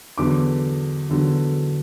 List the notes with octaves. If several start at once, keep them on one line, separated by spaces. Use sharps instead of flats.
E2 D3 F#3 D6
E2 D3 F#3